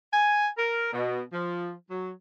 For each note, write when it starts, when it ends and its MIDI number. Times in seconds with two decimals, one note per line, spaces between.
0.13 0.48 80
0.57 0.92 70
0.93 1.21 47
1.32 1.71 53
1.90 2.11 54